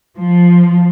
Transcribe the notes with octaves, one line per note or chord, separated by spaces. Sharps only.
F3